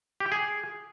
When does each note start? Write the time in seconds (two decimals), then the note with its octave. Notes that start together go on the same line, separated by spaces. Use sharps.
0.20 G4
0.26 G5
0.32 G#4